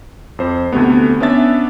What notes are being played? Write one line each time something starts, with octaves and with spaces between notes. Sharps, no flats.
F2 C5
D2 C3 A3 B3
B3 C#4 D4 E5 A6